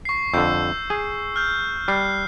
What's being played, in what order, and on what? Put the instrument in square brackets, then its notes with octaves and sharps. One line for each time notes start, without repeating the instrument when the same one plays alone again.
[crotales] C#6 C7
[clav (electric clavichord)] F2 D3 [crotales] E6 G6
[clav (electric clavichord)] G#4
[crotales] F6 G6
[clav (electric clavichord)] G3 [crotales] F#6 C7